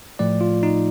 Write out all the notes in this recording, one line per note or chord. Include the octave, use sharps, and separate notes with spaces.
A2 F3 A3 D5
F4
D#4